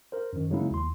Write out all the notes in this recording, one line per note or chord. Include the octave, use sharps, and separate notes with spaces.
A#4 C5
F#2 D#3
C#3 F#3 G#3 A#3 D#4 E4
D#2 C6